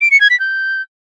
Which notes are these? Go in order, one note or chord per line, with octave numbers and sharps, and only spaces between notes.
D7
C#7
G#6
B6
G6